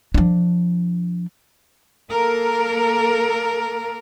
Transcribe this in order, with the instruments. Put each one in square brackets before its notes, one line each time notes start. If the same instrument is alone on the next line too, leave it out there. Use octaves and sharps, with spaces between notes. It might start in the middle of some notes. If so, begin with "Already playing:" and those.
[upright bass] F3 D4
[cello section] A#3 A4 A#4